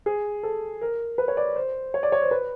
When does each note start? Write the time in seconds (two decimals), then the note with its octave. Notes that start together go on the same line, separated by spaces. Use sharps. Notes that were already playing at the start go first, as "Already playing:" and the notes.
0.06 G#4
0.43 A4
0.81 A#4
1.18 B4
1.28 C#5
1.37 D5
1.56 C5
1.94 C#5
2.03 D5
2.12 C#5
2.22 C5
2.31 B4